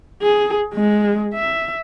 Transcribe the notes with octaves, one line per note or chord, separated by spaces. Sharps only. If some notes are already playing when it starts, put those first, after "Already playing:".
G#4
G#3
E5